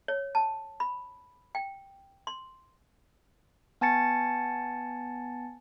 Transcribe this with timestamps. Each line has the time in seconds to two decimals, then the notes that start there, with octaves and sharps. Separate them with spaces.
0.08 C#5
0.35 A5
0.80 B5
1.55 G5
2.27 C6
3.81 B3 G#5 A5 A6 C#7